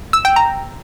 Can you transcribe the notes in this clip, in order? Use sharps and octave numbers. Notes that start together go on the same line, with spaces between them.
E6
G5
A#5